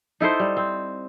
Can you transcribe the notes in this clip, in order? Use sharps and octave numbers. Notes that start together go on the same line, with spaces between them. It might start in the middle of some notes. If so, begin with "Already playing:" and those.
D#4 E4 A4 C5
G3
C4